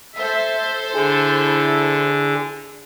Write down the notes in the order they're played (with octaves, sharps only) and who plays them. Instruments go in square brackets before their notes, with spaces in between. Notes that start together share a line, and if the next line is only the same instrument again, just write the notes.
[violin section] A4 C5 [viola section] E5
[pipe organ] D3 [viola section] E4 [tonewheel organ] G#4